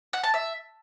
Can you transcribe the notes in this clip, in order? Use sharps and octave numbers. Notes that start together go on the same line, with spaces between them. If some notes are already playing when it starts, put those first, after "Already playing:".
F#5
A5
E5